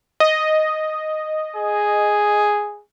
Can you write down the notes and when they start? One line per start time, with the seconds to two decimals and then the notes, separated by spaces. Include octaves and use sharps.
0.20 D#5
1.55 G#4